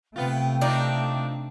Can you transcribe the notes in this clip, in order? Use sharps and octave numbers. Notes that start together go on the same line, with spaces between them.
C3 A3 B3 F4 G5
C4 D4 D#4 F4